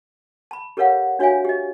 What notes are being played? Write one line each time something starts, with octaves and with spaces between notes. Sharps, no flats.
A5 B5
G4 A4 A#4 C#5 F5 F#5
D4 F#4 C#5 E5 F5 G#5
G4 D#5